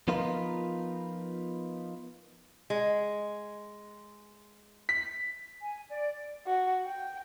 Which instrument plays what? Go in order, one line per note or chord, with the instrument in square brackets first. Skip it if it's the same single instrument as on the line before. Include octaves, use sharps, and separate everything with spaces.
[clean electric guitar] F3 B3 D#4 F4 A#4 B4
[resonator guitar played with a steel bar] G#3
[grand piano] B6
[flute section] G#5
D5
[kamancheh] F#4
G5